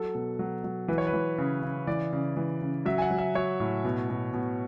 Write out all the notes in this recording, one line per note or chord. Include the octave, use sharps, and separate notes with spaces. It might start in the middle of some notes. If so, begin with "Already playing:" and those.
Already playing: F#3 A4
B2
F#3
F#3
E3 B4
C#5
B4
E3
C#3
C#3
E3 D5
C#3
E3
C#3
F#3 E5
G#5
F#5
F#3
E5
F#3 C#5
A2
B2
B2
B2